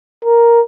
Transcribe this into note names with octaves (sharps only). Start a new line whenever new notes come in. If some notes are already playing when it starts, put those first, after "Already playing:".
A#4